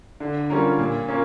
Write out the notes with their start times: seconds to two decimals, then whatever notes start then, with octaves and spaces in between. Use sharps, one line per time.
0.20 D3
0.50 G3 C#4 F4 A#4
0.79 A#2
1.08 A#3 C#4 F4